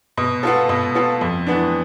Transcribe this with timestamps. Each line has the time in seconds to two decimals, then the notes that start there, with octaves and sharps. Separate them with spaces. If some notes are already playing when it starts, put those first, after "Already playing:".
0.18 B2
0.43 B3 F4 A4
0.69 B2
0.95 B3 F4 A4
1.21 F2
1.47 E3 B3 D4